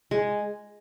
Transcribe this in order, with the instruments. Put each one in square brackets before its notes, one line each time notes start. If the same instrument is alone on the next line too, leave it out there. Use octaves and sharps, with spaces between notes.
[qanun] G#3